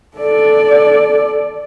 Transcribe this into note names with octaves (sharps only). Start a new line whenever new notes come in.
A4 D5